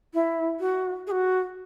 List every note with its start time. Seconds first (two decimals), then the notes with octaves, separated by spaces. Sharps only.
0.14 E4
0.60 F#4
1.07 G#4
1.11 F#4